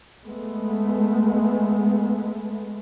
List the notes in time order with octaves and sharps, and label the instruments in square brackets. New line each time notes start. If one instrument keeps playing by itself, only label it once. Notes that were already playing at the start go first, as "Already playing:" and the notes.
[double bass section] G#3 A3 B3